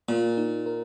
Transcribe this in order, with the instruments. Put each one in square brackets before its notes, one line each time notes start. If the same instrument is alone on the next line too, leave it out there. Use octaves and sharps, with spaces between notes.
[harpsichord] A#2 [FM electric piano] A#3
[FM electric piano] D#4
A#4